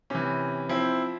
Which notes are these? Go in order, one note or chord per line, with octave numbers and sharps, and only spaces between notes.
C3 E3 C#4
F3 C4 E4